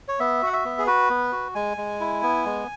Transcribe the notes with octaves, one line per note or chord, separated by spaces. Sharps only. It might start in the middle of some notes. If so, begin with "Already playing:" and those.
C#5
B3 E5
F#4 F#5
E5
B3
G#4
F#4 B4
B3
F#4
G#3 G#5
G#3
E4
B3
G#3